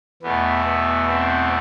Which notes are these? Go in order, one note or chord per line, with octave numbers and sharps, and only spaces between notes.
E2 B2 A3 B3
B3
C4